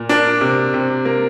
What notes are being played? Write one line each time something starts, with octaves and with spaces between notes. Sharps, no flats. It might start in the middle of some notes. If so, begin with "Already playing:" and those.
Already playing: A#2
A#3 D4
C3
C3
A#3